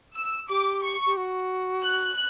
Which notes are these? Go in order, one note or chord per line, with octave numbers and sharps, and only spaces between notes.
E6
G4 D6
C#6
G4
F#4
F#6